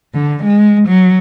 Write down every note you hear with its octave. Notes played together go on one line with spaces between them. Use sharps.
D3
G#3
F#3